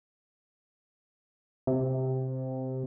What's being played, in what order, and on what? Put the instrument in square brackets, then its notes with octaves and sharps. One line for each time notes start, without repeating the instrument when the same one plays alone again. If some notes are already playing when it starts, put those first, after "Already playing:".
[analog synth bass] C3